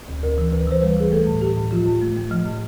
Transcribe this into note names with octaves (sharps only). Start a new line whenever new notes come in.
D2
D2 A#4
E3
D2 B4
E3 C5
G3 B4
E3 G#4
A3 A4
A2
A2 G4
A2
F3 F4
A2
A3
A3
F3
A2